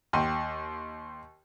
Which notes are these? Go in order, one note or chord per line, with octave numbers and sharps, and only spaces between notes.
D#2 G5 C6 D#7